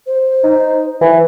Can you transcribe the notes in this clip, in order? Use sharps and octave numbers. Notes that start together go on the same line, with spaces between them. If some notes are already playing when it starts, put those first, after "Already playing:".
C5
D#4
E3